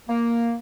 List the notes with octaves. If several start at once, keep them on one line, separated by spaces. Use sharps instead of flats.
A#3